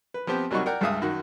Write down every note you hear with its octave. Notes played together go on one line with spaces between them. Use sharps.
B4
F3 B3 C4 G4
C2 F#3 G3 D#4 F#4 C#6
A#4 D5 F#5 G5
C#2 G2 G#4 E5 F5 D#6
F#2 D#3 F#4